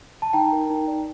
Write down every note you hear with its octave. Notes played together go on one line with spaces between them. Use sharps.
A5
D#4 G5 A#5
A#4
D#4
D5